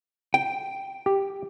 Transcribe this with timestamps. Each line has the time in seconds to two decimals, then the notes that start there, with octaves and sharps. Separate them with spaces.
0.34 G5
1.06 G4